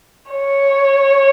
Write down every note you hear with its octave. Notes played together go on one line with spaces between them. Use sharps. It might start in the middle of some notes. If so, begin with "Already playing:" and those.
C#5